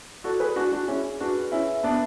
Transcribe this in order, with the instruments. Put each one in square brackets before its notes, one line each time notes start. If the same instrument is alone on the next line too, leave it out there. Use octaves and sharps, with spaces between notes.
[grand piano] F#4 A4 [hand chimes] D5
[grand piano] G#4 B4
[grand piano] D4 F#4 [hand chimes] G#5
[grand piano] D4 F#4
[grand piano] C#4 E4 [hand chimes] G#4
[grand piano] D4 F#4 [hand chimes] B4
[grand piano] C#4 E4 [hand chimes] E5
[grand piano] B3 D4 [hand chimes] A5